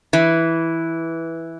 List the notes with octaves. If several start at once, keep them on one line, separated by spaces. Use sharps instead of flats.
E3